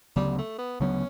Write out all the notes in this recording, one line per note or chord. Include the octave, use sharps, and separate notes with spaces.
D2 C#3 F#3 G3 B3
A3
B3
D2 C#3 F#3 B3 C#4